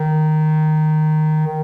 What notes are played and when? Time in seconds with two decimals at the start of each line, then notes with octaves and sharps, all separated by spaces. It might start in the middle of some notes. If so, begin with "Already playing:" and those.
Already playing: D#3
1.47 D#3